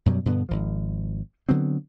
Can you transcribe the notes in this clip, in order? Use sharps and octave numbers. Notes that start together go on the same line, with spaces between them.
F#2 B2 F#3 G3
G2 B2 D3 B3
G#1 F3
D3 F#3 B3 C4